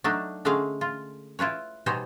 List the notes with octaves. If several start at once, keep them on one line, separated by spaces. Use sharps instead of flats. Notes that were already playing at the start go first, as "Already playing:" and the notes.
F#3 A3 D4 D#4
D3 G#3 A3 C#4 G#4 F5
F4
E4 F4 B4 C#5
B2 G3 D#4 C5 C#5 G#5